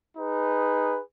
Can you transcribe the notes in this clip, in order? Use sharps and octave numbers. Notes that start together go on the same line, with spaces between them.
D#4 G#4 B4